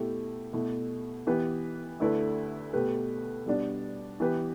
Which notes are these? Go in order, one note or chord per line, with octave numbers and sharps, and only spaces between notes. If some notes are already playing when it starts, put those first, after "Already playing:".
Already playing: B2 A3 E4 G4
B2 A3 E4
E3 B3 G4 B4
D2 D3 A3 E4 B4
B2 A3 G4 B4
B2 G3 B3 D4
E3 B3 G4 B4